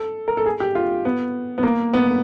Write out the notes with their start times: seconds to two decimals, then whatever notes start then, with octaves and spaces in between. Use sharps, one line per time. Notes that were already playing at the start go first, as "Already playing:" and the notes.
Already playing: A4
0.28 A#4
0.37 A4
0.46 G#4
0.60 G4
0.75 F4
1.05 B3
1.58 B3
1.63 A#3
1.93 B3